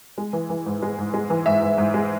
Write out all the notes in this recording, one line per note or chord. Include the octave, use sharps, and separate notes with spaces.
G#3
E3
E3
G#2
G#3
G#2
G#3
E3
G#2 E5
G#2
G#2
G#3